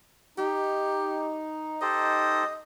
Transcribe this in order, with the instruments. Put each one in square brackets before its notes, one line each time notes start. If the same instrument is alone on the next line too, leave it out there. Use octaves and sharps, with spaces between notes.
[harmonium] D#4 [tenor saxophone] G4
[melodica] G4 A4 C5 [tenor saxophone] D#5